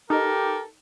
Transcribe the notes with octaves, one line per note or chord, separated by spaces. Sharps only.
D#4 G4 A4 A#4